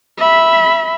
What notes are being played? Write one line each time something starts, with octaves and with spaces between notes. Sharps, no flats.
E5 B5